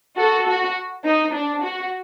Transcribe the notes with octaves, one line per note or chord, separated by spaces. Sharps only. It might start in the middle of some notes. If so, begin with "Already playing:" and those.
F#4 A4
F#4
D#4
D4
F#4